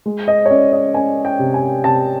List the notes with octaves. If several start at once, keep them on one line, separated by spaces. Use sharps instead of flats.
G#3
D#5
C#5
C#4 D5
D#5
C#4 G#5
G5
C3
G#5
C3 A5